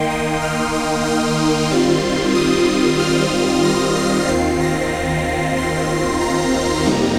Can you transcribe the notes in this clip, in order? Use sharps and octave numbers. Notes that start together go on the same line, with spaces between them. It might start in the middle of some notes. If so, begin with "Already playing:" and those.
Already playing: D#3 A#3 D#4 G5 C6
D#6
F6
D#6
C6
D#3 G3 C4 F4
D#6
F6
A#6
C7
D#2 D#3 C4 F4 C7
A#6
C6
A#5
F2 C3 G3 A#3 D#4